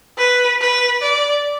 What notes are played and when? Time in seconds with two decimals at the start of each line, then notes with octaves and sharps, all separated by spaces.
0.18 B4
0.60 B4
1.02 D5